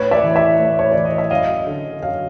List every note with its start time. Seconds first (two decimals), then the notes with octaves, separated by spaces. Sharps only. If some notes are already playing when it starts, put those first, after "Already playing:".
Already playing: A2 B4 C#5
0.11 D5 E5
0.24 E3
0.35 D5 E5
0.59 A2
0.79 C#5
0.92 E3 D5
1.05 D#5
1.18 E5
1.31 F#2 D#5 F5
1.67 D3
2.03 F#2 F5